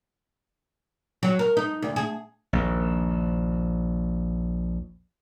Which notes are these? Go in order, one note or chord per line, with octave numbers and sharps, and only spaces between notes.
F#3
A#4
D#4
D2
G#4
A#1 D#2